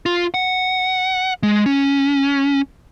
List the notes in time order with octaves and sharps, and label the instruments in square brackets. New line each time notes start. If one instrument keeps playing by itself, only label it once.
[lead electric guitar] F4
F#5
G#3
C#4